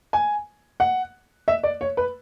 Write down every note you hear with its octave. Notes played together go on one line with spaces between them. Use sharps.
G#5
F#5
E5
D5
C#5
B4